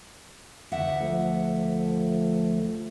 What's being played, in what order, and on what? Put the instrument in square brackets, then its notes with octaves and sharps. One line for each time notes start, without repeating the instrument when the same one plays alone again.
[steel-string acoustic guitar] D2 E5 F#5
[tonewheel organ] F3 A3